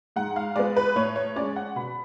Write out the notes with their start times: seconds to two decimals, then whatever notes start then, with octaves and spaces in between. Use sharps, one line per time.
0.16 G#2 F#5
0.36 F5
0.56 G#3 B3 D5
0.76 B4
0.96 A2 C#5
1.16 C#5
1.36 G#3 C#4 D5
1.56 F#5
1.76 B2 B5